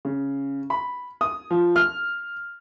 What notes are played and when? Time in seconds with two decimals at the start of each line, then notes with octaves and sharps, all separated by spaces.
0.05 C#3
0.70 B5
1.21 D#6
1.51 F3
1.76 F6